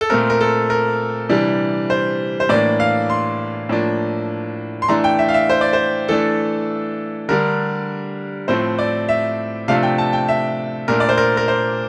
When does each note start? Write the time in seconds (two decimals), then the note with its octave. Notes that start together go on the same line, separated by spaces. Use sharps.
0.01 A4
0.10 A#2 A3 C4 A#4
0.30 A#4
0.41 A4
0.70 A#4
1.29 C3 E3 G3 D4
1.90 C5
2.40 C5
2.49 A2 E3 A#3 D4 D5
2.80 F5
3.10 C6
3.69 A2 F3 A#3 D4
4.82 C6
4.88 E3 A3 D4 A#5
5.04 G5
5.19 E5
5.29 F5
5.34 E5
5.49 C5
5.61 D5
5.73 C5
6.08 E3 A3 D4 A4
7.29 D3 G3 D4 A#4
8.48 A2 F3 A3 C4 C5
8.79 D5
9.09 E5
9.68 C3 F3 A3 D4 F5
9.83 G5
9.98 A5
10.13 G5
10.28 E5
10.88 A#2 A3 D4 A#4
11.00 D5
11.09 C5
11.18 A#4
11.37 A#4
11.48 C5